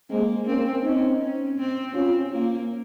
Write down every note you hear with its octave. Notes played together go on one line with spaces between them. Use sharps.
G#3 A#3 C4
A#3 C4 C#4
C4 C#4 D#4
C#4
C4
C4 C#4 F4
A#3 C#4 F4